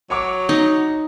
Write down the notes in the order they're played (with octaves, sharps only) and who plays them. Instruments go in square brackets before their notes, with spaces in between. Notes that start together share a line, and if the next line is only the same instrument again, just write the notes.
[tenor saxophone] F#3 [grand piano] C#5 C#6 D6
[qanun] D#4